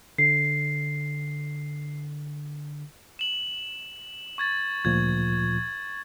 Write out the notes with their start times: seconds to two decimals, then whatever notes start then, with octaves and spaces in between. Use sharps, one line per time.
0.18 D3 C7
3.19 E7 F#7
4.38 C#6 G#6 A6
4.85 D2 A#2 F3 G#6